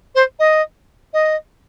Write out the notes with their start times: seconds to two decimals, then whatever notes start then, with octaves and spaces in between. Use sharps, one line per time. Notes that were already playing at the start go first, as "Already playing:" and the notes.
0.15 C5
0.39 D#5
1.14 D#5